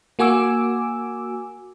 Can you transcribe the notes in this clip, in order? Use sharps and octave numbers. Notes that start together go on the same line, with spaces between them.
A#3 F#4 G#5 D6 E6